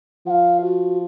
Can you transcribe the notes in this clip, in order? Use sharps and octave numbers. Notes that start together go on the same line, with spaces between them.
F3 F5 F#5
F#4